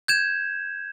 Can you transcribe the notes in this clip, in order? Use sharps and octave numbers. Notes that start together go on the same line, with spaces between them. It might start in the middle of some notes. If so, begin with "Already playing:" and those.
G6 G#6 E7